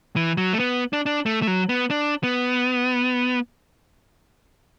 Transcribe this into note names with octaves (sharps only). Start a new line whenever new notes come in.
E3
F#3
A3
B3
D4
D4
A3
A3
F#3
B3
D4
B3